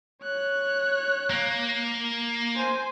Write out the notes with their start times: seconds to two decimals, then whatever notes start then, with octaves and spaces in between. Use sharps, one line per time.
0.22 C#5 F#6
1.30 A#3
2.56 C5 G#5